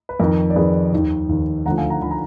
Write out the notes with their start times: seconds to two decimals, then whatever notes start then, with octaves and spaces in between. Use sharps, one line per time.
0.09 B4
0.19 F2 D#3 A#4
0.50 D5
0.56 F2 D#3 G#4 B4
0.92 D#2 D#3
1.29 D#2 D#3
1.66 D2 D3 F3 F#5 A#5
1.78 F5 G#5
1.90 F#5 A#5
2.02 D3 F3 B5
2.11 A#5